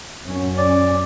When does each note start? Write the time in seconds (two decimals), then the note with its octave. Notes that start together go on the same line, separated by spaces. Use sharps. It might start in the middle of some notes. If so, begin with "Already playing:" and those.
0.25 F#2 C#4
0.58 D5